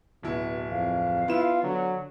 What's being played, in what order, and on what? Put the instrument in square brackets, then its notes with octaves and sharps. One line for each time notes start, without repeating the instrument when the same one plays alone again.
[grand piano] D1 E4 [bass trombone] B2
[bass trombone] F2 [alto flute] F5
[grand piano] B3 E7 [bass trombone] E4 [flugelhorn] F4
[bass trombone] D3 [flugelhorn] F#3